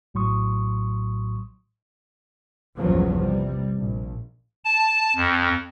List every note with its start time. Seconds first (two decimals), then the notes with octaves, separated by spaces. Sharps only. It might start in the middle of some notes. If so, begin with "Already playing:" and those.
0.14 A#1 A2 F#3 C6 C#6 D#6
2.77 A#1 E2 G2 C#3 F3 F#3
3.20 C3 G3
3.78 A#1
4.64 A5
5.16 F2